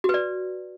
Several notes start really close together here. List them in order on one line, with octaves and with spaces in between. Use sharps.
F#4 B4 D5